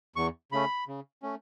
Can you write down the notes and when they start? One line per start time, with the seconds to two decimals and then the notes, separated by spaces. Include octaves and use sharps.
0.16 E2 C#6
0.52 C#3 A3 C#4 B5
0.88 C#3
1.23 A3 C#4